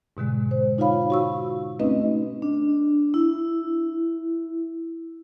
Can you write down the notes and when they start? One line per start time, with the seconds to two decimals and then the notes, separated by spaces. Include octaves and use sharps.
0.17 G#2 B2 D3 G#3
0.51 C5
0.78 D#4 F4 C#5 F5 B5
1.10 F#4 C#6 E6
1.79 A3 C4 C#4 D#4 B4 D#5
2.42 D4
3.14 E4